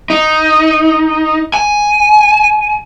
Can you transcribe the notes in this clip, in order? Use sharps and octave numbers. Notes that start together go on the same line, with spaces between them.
D#4
G#5